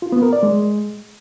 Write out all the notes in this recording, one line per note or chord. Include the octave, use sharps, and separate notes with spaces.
F4
B3
A#4
D5
G#3